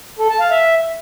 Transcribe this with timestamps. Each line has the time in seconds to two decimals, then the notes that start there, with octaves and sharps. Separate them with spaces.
0.19 A4
0.29 A5
0.40 F5
0.51 E5